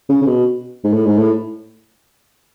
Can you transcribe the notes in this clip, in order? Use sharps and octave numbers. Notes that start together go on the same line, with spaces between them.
C#3
C#3
B2
G#2
A2
G#2
A2